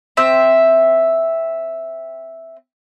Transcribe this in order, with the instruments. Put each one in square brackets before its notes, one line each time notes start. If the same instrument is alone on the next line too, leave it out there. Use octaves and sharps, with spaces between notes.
[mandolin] C4 E5